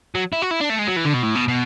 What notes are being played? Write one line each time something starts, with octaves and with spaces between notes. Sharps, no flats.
F#3
E4
F#4
E4
D4
A3
G#3
F#3
E3
D3
B2
A2
B2
B2